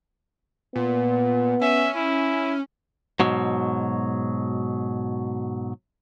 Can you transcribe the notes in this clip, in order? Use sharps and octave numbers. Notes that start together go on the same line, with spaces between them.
A#2 B3
C#4 E5
E4
G#2 B2 F#3